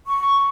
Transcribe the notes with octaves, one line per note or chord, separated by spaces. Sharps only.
C#6